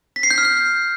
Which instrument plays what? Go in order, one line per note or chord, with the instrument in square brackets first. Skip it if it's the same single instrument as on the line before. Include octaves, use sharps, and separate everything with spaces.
[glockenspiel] B6
C7
G6
F6
G6